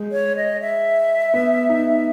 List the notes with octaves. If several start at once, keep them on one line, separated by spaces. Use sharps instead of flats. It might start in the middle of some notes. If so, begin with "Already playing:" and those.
Already playing: G#3
C#5
D#5
E5
B3
D#4